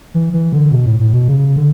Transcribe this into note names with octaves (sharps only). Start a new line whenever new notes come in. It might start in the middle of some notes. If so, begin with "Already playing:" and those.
E3
E3
D3
B2
A2
A2
B2
C#3
D3